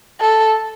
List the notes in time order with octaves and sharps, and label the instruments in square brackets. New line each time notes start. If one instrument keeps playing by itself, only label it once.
[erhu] A4